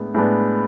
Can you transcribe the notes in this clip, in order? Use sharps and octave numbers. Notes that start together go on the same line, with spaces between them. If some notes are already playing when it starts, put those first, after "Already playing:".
Already playing: A2 G#3 B3 D4
A2 G#3 B3 D4